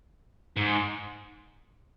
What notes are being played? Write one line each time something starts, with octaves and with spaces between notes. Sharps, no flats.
G#2